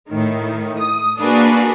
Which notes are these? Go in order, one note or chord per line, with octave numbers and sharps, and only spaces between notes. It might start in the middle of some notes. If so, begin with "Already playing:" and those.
A2 D#3
D#6
A#3 D4 F#4 G#4 B4